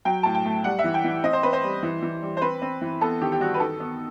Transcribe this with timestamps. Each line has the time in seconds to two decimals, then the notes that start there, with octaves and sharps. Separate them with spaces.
0.05 F#3 G5
0.23 A2 A5
0.35 G5
0.45 A3
0.64 G3 F#5
0.79 E5
0.84 E3
0.94 G5
1.04 E3
1.23 C4 D#5
1.33 C5
1.43 C4 B4
1.53 C5
1.63 G3
1.83 E3
2.02 E3
2.22 G3
2.37 C5
2.42 C4 B4
2.62 C4
2.81 E3
3.01 B3 A4
3.21 D#3 G4
3.32 G4
3.40 G3 F#4
3.54 B4
3.60 D#3 A4
3.80 B3